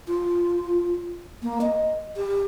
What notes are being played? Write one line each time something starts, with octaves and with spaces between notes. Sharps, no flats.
F4
A#3
D#5
G4